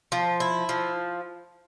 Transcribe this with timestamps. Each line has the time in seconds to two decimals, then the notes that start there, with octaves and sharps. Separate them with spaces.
0.12 F3
0.40 E4
0.69 F3